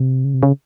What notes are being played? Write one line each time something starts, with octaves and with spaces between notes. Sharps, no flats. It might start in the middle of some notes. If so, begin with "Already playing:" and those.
Already playing: C3
C#3
C3
C#3